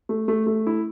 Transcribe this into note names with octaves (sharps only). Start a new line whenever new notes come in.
A3
A3
A3
E4